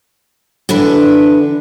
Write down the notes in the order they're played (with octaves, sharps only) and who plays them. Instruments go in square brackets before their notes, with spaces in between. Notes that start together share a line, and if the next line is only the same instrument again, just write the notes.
[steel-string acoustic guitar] D3 E3 D4 B4